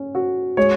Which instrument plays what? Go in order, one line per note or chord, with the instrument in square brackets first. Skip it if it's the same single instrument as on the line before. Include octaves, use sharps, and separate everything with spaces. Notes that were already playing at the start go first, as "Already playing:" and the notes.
Already playing: [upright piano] C#4
F#4
[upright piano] G#3 [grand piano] C#5